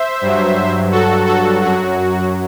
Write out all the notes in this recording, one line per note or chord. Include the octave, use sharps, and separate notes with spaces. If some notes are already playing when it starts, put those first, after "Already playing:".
Already playing: C5 E5
G2 F#3
F#4 A4
F#4 A4
F#2 F#3 F#4